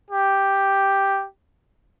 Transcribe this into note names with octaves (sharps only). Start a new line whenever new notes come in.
G4